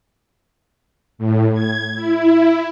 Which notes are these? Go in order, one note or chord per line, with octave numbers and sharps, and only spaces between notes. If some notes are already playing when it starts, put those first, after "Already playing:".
A2
G#6
E4